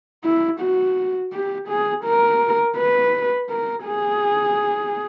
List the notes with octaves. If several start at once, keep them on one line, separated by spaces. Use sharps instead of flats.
E4
F#4
G4
G#4
A#4
B4
A#4
G#4